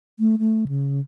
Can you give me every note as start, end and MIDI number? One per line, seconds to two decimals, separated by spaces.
0.19 0.36 57
0.39 0.65 57
0.68 1.00 49